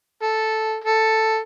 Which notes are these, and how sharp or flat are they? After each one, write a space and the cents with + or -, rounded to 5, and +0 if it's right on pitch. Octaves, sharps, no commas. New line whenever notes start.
A4 -5
A4 +5